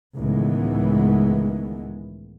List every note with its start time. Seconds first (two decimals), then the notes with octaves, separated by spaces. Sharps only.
0.16 C#2 A2 D#3 E3 G#3 B3